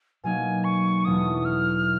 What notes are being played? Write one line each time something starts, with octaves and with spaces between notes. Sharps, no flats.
B2 F#3 A#3 D#4 G#5
C#6
E2 B2 F#3 A3 D4 D#6
F6